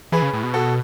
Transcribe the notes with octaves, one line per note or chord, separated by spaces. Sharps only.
E3 G#4 B4
C#3
A2
B2
F#4 A4